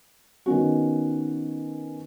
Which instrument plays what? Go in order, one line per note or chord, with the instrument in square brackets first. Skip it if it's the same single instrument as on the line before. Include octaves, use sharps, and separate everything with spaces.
[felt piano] D#3 B3 C#4 F#4